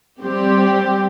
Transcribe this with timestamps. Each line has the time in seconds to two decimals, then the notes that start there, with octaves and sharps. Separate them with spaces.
0.22 G3 C4 G4